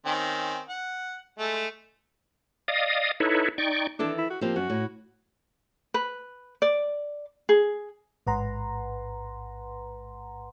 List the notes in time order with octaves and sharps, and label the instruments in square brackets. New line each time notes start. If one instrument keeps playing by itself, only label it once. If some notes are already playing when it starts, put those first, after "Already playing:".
[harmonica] D#3 C4 C#4
F#5
G#3 A3 A4
[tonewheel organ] D5 D#5 F5 D#6
D#4 E4 A4 B4 C#5
D#4 D5 G5 C#6
[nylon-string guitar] D#3 E3 A4 [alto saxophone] D4
[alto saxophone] E4
F#4
[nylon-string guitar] F3 A#3 G4 [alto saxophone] C4
[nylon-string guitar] F#2 [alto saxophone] F#4
[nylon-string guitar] A2
[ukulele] B4
D5
G#4
[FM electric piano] A1 G#2 B4 F#5 A#5 C6